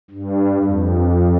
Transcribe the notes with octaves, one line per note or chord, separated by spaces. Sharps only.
G2
F2